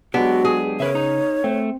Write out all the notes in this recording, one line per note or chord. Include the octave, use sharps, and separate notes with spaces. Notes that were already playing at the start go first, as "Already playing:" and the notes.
F#3 G#3 B3 D4 F#4 G4
G#4
C#3 A#4 B4 C#5 E5
D#4 A#5
A3 C4